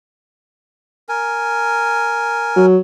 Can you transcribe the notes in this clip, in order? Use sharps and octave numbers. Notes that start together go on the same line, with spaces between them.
A#4 G#5
F#3